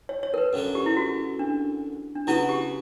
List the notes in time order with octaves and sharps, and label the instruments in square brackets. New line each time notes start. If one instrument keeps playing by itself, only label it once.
[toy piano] C#5
C#5
A#4
B4
[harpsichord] F#2 D3 F#3
[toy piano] G4
E4
F#4
D4
D4
[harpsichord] C#3 F#3 B3 F#4 B4 [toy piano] E4
[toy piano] G4